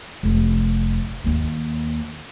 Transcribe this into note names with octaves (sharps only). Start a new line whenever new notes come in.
F1 F2
D#2 A#3